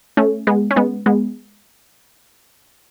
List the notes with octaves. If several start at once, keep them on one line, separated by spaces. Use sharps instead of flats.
A3 C#4
G#3 B3
C#4
G#3 B3
G#3 B3